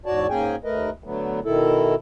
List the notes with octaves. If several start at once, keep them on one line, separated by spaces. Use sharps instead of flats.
E2 G#2 F#4 C#5 D5 A5
G#2 A#3 C#4 G#4 G5 G#5
D#2 A3 A#4 B4 D#5
D3 F#3 A3 B3
B2 D#3 E4 A4